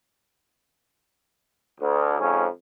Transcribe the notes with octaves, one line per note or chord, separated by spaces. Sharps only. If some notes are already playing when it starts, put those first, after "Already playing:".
D2
F2 G#2 C#4